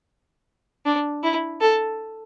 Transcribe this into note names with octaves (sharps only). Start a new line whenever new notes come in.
D4
E4
A4